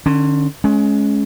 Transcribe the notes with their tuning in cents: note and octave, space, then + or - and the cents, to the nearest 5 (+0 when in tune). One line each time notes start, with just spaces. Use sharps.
D3 +35 C#4 +0
G#3 +25 C#4 +0